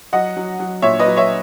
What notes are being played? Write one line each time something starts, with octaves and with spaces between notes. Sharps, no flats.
F#3 D#5 F#5
F#3
F#3
A#2 C#5 E5
B4 D#5
F#3
C#5 E5